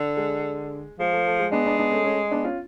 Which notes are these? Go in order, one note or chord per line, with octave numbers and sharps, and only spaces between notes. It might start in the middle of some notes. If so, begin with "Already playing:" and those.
Already playing: D3
G#3
F3 G#3
A3
A3
G#3
G#3 B3 D4
B3 D4
B3 D4
A3 C#4
A3 C#4
B3 D4
C#4 F4